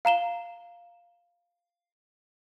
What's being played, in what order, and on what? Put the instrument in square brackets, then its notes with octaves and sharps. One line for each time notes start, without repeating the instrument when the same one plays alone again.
[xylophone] F5 A#5 E7 G7